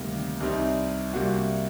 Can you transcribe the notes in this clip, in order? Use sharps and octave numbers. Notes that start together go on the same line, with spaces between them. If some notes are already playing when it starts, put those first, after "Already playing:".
Already playing: D2 C3 D#3 G3 A#3
C2 C3 G3 C4 D#4
C2 C3 G3 A#3 F#4